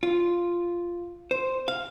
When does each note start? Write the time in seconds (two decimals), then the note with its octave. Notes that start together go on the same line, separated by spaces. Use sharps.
0.03 F4
1.31 C5
1.68 F5